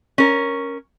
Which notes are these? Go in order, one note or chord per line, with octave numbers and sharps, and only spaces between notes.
C#4 A#4